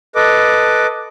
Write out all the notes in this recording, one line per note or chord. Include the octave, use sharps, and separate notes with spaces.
A4 B4 D#5 D6